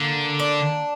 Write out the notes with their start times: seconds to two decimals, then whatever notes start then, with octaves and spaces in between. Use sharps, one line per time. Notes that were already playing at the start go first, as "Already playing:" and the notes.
Already playing: D3 A#3
0.40 D4